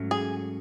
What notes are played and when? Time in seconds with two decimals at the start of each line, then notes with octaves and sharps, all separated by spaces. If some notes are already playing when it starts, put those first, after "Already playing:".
Already playing: G#2 F#3 A3 C#4
0.11 G#4